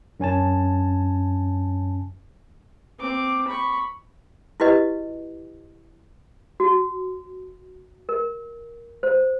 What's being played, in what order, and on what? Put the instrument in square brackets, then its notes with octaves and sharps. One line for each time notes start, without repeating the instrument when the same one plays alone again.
[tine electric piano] F#2 C#4 G#5 A5
[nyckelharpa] C4 D6
B5 C#6
[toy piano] E4 F#4 G4 B4 D#5
F#4
A#4
C5